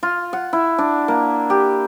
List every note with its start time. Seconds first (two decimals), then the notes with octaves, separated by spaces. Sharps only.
0.03 F4
0.33 F#5
0.53 E4
0.78 D4
1.08 A#3
1.50 G4